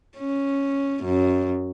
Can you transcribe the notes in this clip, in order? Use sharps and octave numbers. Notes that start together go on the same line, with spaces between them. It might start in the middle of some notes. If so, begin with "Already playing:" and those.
C#4
F#2